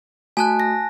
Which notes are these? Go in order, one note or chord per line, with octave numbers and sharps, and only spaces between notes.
A3 F#4 G#5 A5 F#6
A#6